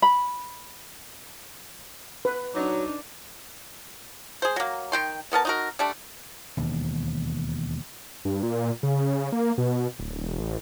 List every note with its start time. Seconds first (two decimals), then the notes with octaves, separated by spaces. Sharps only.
0.02 B5
2.25 B4
2.55 F#3 D4 D#4
4.42 G#4 C5
4.56 F#3 A#3
4.92 D#3 G5 C6
5.32 E3 B3 A#4 A5
5.45 D#4 F#4 A#4
5.79 G3 A3 D4
6.57 E1 D#2
8.25 G2
8.43 A#2
8.83 C#3
9.32 A#3
9.58 B2
9.99 D1
10.22 E1
10.39 A1